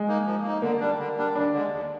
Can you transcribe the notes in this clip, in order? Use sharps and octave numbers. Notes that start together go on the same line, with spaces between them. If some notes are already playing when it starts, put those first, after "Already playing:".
Already playing: G#3
A#3 D#4
F3
A#3 D#4
D3 A#3
G3 D4
D3
G3 D4
D#2 D4
D3 G#3
D#2